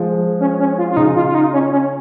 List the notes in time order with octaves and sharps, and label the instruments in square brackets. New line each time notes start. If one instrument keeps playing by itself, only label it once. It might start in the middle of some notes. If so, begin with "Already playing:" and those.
Already playing: [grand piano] F3 G#3
[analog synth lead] C#4
C#4
F4
F4
[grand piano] C#3 [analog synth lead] D#4
[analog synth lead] F4
F4
D#4
C#4
C#4